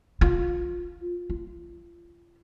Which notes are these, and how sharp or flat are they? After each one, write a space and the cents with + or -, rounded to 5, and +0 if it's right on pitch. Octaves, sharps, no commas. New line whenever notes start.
F4 +10
F4 -30